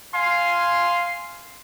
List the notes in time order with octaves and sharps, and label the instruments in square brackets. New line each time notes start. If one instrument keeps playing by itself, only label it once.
[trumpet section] F5 G#5 C6